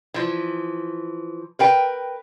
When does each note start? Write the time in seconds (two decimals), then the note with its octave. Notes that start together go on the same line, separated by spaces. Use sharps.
0.14 E3 F3
1.59 A#4 B4 G5